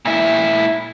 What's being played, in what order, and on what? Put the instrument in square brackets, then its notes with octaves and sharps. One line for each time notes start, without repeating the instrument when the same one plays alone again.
[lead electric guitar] A#2 E4